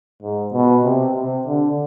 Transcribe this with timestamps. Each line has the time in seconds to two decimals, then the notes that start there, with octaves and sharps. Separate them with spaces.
0.22 G#2
0.53 B2
0.84 C3
1.15 C3
1.47 D3